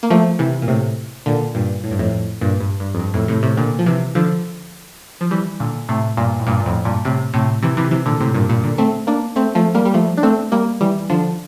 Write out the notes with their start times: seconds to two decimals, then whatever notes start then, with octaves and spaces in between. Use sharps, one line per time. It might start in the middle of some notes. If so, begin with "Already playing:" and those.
0.03 A#3
0.10 F3 A3
0.39 C3 E3
0.62 A#2
0.68 A2 C3
1.26 A#2 D3
1.55 G2 A#2
1.84 A2
1.91 G2
1.99 F2 A2
2.41 G2 A#2
2.60 G2
2.80 G2
2.95 F2
2.99 G2
3.14 F2 A2
3.28 A2 C3
3.43 A2 C3
3.57 A#2 D3
3.79 F3
3.86 C3 E3
4.15 D3 F3
5.21 F3
5.31 E3 G3
5.60 A#2 D3
5.89 A2 C3
6.17 G2 A#2
6.40 A2
6.47 G2 A#2
6.60 A#2
6.66 F2 A2
6.85 G2 A#2
7.05 A2 C3
7.34 A2 C3
7.63 C3 E3
7.77 C3 E3
7.91 C3 E3
8.06 A#2 D3
8.20 A2 C3
8.34 G2 A#2
8.49 G2 A#2
8.64 A#2 D3
8.78 A3 C4
9.07 A#3 D4
9.36 A3 C4
9.55 F3 A3
9.75 G3 A#3
9.85 G3
9.94 F3 A3
10.17 D4
10.23 A3 C4
10.52 G3 A#3
10.81 E3 G3
11.10 D3 F3